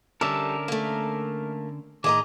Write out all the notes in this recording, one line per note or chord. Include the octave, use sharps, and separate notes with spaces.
D3 G3 A3 C#4 A4 A#4 D5 E5
A3 A#3
A2 D#3 G#4 D#5 A#5 D6